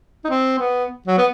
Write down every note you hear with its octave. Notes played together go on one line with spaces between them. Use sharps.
D#4
C4
B3
F#3
B3